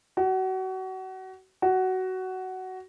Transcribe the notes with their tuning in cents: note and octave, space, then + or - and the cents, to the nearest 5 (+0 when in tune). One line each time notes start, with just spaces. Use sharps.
F#4 +30
F#4 +15